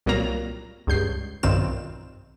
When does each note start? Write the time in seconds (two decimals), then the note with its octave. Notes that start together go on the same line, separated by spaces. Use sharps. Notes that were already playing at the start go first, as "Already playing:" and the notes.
0.06 C2 A#2 F#3 G3 A#3 A#5
0.87 C#2 G2 G6 C7
1.43 B1 G2 D#3 C4 F4 E7